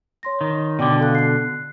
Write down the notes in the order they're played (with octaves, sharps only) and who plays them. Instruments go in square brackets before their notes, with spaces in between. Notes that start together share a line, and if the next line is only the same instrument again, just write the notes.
[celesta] C#5 C6 A#6
[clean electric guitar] D#3
[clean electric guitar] B2 D3 [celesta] D5 G5 D6
[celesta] A4 F5 F#6
F#6 C7